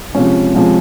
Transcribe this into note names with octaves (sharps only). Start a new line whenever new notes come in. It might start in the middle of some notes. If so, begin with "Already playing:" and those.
C3 F3 G#3 C#4
C3 F3 G#3 C#4